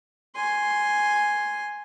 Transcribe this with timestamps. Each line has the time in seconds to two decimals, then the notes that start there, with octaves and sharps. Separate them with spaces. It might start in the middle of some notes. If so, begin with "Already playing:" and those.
0.36 G#5 C6